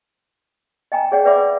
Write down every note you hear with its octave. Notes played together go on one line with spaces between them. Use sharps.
D#5 G5 G#5 A#5
G#4 C#5 D5 F#5 G5
B4 D5 E5 F#5 B5 D6